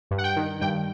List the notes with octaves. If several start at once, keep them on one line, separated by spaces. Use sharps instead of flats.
G2
F#5
G5
D#3
G2 G5